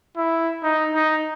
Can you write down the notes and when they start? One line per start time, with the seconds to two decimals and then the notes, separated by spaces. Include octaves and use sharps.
0.17 E4
0.63 D#4
0.94 D#4